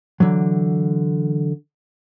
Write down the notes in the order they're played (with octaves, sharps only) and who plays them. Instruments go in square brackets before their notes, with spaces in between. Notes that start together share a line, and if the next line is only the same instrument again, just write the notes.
[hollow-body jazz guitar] D3 E3 F#3